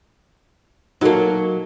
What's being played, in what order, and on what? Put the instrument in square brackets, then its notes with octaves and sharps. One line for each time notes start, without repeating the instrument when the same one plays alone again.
[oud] F#3 A#3 [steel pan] D#4 F#4 A4